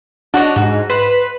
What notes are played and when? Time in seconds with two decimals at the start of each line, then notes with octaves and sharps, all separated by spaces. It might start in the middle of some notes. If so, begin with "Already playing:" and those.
0.34 D4 F#4 C#5 D#5
0.56 G#2 F#4
0.90 B4 C5